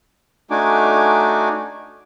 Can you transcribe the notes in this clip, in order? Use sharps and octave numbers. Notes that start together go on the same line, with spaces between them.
A3 D4 D#4 F#4 G#5 D6